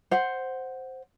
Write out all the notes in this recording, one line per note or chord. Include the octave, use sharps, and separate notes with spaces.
C5 F#5